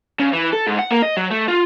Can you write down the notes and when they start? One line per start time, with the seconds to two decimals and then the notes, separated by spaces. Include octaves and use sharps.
0.19 C#3
0.32 E3
0.53 A4
0.67 G#2
0.79 F#5
0.91 A#3
1.02 D#5
1.17 F#3
1.30 A3
1.48 F4